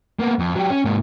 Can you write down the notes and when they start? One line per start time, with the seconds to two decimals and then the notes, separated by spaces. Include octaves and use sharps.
0.19 A#3 B3
0.39 F2
0.56 F#3 G4
0.71 C#4
0.85 G#2 A#3